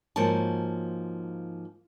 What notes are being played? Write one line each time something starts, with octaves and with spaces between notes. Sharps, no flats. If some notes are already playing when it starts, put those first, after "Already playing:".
G#2 F3 A#3 F#4 C#5 A5